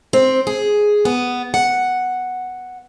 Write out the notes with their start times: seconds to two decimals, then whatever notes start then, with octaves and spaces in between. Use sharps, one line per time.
0.13 C4
0.47 G#4
1.05 B3
1.54 F#5